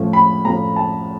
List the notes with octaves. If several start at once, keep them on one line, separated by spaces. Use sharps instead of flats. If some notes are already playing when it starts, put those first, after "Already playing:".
Already playing: A2 F3 A3 C#4
B5
A2 F3 A3 C#4 A#5
A5